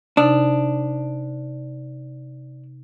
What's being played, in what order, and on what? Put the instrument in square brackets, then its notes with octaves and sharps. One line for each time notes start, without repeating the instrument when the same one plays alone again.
[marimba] C3 D#4 [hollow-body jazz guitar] D4